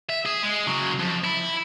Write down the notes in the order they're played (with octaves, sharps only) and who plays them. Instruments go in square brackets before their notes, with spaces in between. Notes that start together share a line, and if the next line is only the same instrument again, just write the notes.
[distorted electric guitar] E5
G#4
G#3
C#3 F#3
F2
E4